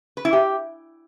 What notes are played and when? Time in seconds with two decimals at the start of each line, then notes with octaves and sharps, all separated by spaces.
0.17 B4
0.25 E4
0.33 G4